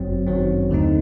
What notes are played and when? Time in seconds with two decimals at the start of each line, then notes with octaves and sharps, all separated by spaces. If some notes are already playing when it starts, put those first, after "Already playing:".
Already playing: G1 F#2 F#3 C4
0.26 G1 F#2 D#3 F#3 C4
0.70 D#2 D3 A3 C4 D#4